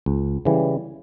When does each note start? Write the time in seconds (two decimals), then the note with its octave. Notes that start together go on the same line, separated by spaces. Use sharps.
0.06 C#2
0.45 C#3 E3 G3